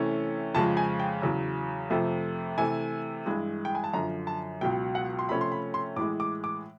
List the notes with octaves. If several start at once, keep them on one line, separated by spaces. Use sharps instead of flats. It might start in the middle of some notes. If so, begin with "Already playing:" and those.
Already playing: C3 E3 A3 C#4
F2 C#3 F3 G#3 A5
G#5
G5
E2 C#3 F#3
F2 C3 F3 A3
C3 E3 A3 G#5
G2 E3 G#3
G5
G#5
A5
F#2 D3 F3 A#5
A5
C#2 B2 F#3 G5
F#5
C6
C3 F3 A3 C#4 B5
C6
B5
C6
A2 E3 G#3 D6
D6
D6